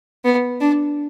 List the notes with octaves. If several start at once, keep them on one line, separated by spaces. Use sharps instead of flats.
B3
D4